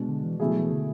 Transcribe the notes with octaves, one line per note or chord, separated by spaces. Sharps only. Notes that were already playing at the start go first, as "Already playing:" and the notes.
Already playing: B2 G#3 D4
D3
E3
B2 E3 A3 E4 G#4
F#3
E3
D3